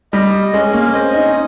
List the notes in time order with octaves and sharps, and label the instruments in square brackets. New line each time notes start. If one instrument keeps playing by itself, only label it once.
[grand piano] G3 [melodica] D#5
[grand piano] G#3 [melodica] C#4
[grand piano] A#3
[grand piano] C4 [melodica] D#5
[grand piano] D#4